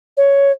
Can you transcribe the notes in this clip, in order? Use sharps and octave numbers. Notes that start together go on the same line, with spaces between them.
C#5